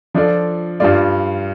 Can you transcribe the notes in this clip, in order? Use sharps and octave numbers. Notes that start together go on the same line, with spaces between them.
F3 D4 F4 A4 D5
G2 G3 F4 D5